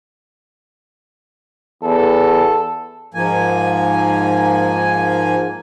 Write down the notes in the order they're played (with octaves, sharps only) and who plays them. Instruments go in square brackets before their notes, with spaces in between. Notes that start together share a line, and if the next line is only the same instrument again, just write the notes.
[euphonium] E2 [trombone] A4
[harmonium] G#2 F3 A#3 G#5